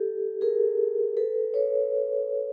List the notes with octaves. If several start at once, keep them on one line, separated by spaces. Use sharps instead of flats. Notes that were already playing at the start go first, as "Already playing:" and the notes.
Already playing: G4 A4
G#4 A#4
A4 B4
B4 C#5